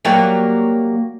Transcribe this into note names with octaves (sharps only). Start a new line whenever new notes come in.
F#3 G3 A#3